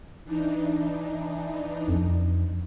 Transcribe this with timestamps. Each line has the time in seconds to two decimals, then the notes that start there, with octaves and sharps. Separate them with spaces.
0.25 E3 D4 D#4
1.88 F2